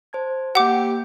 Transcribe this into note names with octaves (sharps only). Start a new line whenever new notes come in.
C5 A5 G#6
A#3 G4 E5 F#5 G5 D6